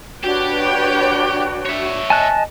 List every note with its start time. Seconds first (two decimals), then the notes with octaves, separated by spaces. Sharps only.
0.23 D4 F#4 G4 B4 C#5 G5
1.66 C#5 E5
2.10 D#5 G#5 A5 F#6